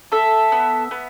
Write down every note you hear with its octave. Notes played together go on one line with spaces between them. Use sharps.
A4 E5
B3
B3